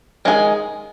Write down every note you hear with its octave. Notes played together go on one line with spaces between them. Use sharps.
D#3 G#3 D#4 G#4